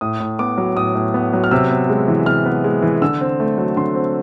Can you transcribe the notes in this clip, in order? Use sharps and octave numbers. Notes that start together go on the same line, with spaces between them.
A2 D#6
A2
B3 D6
F#3
A2 D#6
A2
B3
F#3
F6
C3 E6
B3
G#3
E3
C3 F6
B3
G#3
E3
D3 E6
C4
A3
F#3
D3 C6
C4